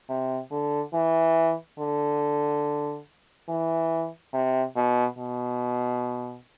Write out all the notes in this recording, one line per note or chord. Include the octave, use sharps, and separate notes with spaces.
C3
D3
E3
D3
E3
C3
B2
B2